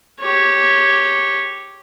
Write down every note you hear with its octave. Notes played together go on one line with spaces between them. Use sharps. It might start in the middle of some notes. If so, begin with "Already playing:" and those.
G4 C#5